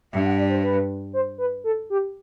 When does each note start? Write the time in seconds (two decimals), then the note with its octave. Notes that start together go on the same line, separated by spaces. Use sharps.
0.12 G2 E5
0.25 F#5
0.38 D5
0.50 C5
0.63 B4
1.13 C5
1.38 B4
1.64 A4
1.90 G4